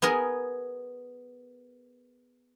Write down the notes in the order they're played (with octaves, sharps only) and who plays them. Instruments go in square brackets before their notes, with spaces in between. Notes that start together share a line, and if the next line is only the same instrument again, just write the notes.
[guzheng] B3 G#4 A#4